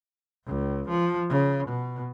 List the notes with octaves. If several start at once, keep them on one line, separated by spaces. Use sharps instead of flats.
C#2
F3
C#3
B2